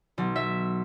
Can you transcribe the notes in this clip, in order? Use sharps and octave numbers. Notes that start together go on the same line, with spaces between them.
B1
E5